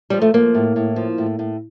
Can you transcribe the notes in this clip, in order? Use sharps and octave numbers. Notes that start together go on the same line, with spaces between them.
F3 G3
A3
F3 A#3
A2
A2
F3
A2
A2